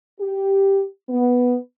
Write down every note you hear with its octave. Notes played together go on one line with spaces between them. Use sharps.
G4
B3